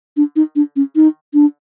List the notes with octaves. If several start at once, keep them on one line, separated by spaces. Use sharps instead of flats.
D4
D#4
D4
C#4
D#4
D4